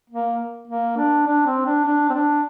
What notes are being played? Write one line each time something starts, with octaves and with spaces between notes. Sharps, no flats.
A#3
A#3
D4
D4
C4
D4
D4
C4
D4